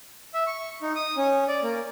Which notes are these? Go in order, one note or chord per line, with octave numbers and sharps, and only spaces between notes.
E5
C#6
D#4
D#6
C#4
D5
A#3